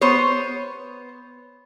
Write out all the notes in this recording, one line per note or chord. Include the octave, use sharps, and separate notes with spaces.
B3 C5 C#5